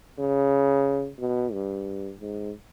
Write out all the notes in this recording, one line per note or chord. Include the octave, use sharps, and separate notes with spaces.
C#3
B2
G2
G#2